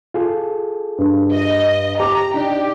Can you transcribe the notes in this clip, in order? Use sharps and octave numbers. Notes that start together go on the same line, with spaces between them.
F4 G#4 A4
G2
D#5
G4 A#5 D6
D4 D#4 G4 D5